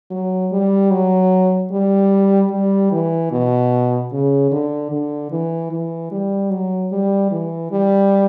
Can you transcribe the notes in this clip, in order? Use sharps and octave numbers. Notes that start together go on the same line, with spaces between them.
F#3
G3
F#3
G3
G3
E3
B2
C#3
D3
D3
E3
E3
G3
F#3
G3
E3
G3